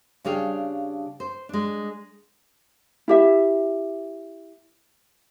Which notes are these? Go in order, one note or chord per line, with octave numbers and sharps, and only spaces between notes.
C#3 G3 D4 G#4 F5 G5
C5
G#3 D4
E4 G4 E5